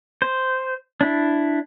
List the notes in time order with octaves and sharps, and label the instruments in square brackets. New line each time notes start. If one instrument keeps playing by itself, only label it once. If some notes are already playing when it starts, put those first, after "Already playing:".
[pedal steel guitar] C5
D4 E4